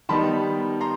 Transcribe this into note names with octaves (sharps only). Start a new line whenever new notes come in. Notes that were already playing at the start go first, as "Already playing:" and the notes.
D#3 G3 B3 D#4 A5 B5
A#5 C6